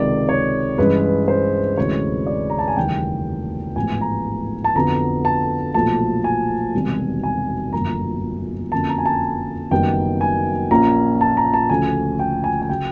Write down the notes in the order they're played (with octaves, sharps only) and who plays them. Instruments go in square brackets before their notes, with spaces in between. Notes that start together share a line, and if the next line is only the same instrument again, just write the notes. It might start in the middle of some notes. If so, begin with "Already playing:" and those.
Already playing: [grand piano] C#2 C3 D#3 G#3 D5
C#5
G2 E3 G#3 C#4 B4
C5
D2 C3 E3 G#3 C#4 C#5
D5
A#5
A5
G#5
F1 D#2 C#3 E3 G3 G5
A1 G#2 F3 G#3 B3 G#5
A#5
A5
F2 D3 F#3 B3 A#5
A5
B1 A#2 F3 A3 A5
G#5
E1 E2 C3 D#3 G3
G#5
G1 F#2 D3 F3 A#3 A#5
F2 D3 F#3 A#3 C#4 A5
A#5
G#5
A5
F#1 F#2 D#3 G3 B3 G5
G#5
A#1 A#2 F3 A#3 C#4 A#5
A5
A#5
A5
D2 C#3 F3 A3 C#4 G#5
G5
G#5
G#5
C#3 F#3 G5